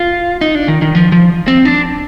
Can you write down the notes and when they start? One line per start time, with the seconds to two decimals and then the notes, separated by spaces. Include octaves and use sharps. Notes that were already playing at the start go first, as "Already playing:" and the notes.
Already playing: F4
0.41 D#4
0.55 D4
0.68 D#3
0.82 D#3
0.95 F3
1.12 F3
1.48 C4
1.65 D4